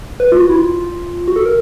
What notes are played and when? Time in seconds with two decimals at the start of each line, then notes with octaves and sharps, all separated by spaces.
0.20 B4
0.32 F4
0.38 F#4
0.49 E4
0.56 F4
1.28 F#4
1.36 A4
1.46 A#4